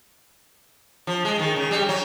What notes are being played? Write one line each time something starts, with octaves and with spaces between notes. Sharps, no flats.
F3
G#3
D#3
C#3
G3
F#3